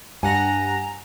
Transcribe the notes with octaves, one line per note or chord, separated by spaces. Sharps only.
G2 F#5 G#5 A#5 A#6